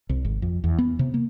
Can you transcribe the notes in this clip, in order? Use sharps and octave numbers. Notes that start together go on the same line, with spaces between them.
C2
G#1
F2
E2
B3
C3
A#3